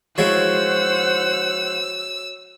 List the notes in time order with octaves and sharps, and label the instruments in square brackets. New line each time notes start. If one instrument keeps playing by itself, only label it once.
[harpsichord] F3 G#3 E4 [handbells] F#4 C#5 [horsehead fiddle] C5 F#5 [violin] E6